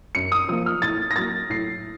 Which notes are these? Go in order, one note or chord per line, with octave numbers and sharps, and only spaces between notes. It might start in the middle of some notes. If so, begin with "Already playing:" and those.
F#2 C#7
D#6
F3 A#3 D#6
F6
A2 A6
A#6
F#3 A#3 A6
A2 C7